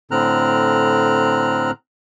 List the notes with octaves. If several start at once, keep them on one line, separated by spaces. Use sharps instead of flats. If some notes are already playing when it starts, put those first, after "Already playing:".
A2 D3 C4 A#5 F6 F#6